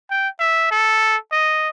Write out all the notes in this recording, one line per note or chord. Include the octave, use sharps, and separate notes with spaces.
G5
E5
A4
D#5